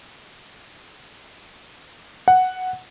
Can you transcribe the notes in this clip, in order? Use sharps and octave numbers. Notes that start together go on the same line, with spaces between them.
F#5